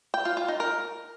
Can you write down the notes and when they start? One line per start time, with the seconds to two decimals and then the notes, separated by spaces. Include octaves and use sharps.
0.14 G5
0.25 F4
0.37 F4
0.48 D#4
0.60 A#4